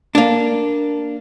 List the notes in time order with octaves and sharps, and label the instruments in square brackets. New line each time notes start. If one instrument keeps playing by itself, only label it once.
[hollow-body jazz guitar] A#3 D4